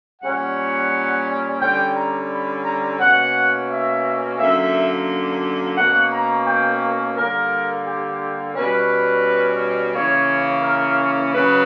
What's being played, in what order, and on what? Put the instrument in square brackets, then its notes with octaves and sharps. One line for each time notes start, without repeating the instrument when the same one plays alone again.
[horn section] A#2 G3 C#4 F#5
D3 G3 C#4 G5
A#5
B5
A#5
B2 A#3 C#4 F#5
E5
F#2 D3 A#3 E5
B2 A#3 C#4 F#5
A#5
G5
D3 G3 A#3 A#4
G4
B2 G3 C#4 B4
C#3 E3 A#3 C#4 C#5
A#4
C#3 F#3 B4